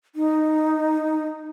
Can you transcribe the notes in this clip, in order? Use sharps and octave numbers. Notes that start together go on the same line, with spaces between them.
D#4